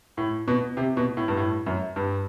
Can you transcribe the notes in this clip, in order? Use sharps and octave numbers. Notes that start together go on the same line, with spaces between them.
A2
B2
C3
B2
A2
G2
A2
F#2
G2